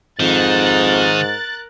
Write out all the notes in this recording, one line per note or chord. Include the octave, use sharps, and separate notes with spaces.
F2 G#2 D#3 A#4 F#6 A6